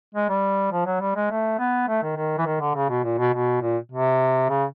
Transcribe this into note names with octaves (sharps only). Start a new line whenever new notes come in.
G#3
G3
F3
F#3
G3
G#3
A3
B3
A3
D#3
D#3
E3
D#3
D3
C#3
B2
A#2
B2
B2
A#2
C3
C#3